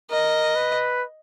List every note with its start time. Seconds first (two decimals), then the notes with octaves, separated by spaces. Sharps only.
0.11 A#4 D#5
0.56 B4